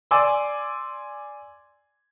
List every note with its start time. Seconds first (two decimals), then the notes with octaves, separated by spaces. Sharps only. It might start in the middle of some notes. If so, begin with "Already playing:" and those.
0.11 D5 G#5 C6 D6 E6